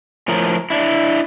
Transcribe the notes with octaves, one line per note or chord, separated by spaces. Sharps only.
A2 F3 A#4
D4 E4